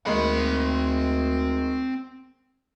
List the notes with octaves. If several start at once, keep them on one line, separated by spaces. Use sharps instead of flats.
D2 D#3 G#3 A#3 C4 B5